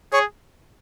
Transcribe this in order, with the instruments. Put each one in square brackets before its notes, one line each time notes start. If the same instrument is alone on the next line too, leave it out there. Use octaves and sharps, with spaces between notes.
[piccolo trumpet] G#4 [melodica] C#5